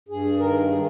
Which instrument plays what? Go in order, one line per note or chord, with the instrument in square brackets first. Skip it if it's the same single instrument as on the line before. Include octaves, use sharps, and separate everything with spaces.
[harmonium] G2 G#4
D#3 A#4
D#3 G#4